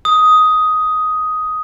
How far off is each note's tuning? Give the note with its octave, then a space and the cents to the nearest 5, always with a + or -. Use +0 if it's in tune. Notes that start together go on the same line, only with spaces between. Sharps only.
D#6 +10